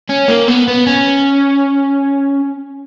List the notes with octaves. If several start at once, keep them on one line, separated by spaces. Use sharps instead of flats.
C#4
A#3
B3
B3
C#4